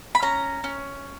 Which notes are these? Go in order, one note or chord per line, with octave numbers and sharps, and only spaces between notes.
B5
C#4 A#5
C#4